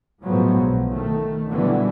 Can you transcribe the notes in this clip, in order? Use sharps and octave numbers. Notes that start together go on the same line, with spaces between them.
A2 F3 F#3 G#3 B3
B1
D#3 A3
B2 D3 E3 F#3 G3 B3